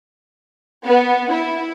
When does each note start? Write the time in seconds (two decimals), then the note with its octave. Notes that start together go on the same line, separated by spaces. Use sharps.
0.85 B3
1.33 E4